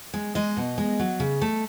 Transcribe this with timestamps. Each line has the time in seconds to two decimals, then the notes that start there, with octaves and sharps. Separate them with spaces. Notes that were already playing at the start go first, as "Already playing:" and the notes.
0.14 G#3
0.35 G#3 D#5
0.57 B2
0.78 G#3
0.99 F#3
1.20 C#3
1.42 A3